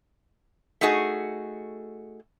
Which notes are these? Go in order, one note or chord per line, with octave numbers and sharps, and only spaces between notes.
A3 D#4 F#4 G#4